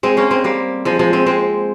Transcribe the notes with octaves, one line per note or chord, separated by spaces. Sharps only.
G#3 C4
A#3 C#4
G#3 C4
G3 A#3
F3 G#3
F3 G#3
G#3 C4
G#3 C4